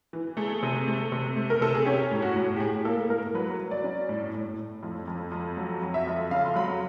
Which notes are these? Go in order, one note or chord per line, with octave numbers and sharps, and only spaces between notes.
E3
A3 G#4
C3
A3
C3
A3
A#4
C3 A4
G#4
C#4 G4
A2
F#4
A2
G4
A2 G#4
A#3 A4
A2 A#4
F#3 B4
F#3
D5
C#4
A2
A2
A2
F2
F2
F2
F#3
F2
E5
F2
C#3 F5
C6
F#3 B5